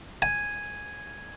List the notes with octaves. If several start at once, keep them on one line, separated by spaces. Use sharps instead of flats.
G#5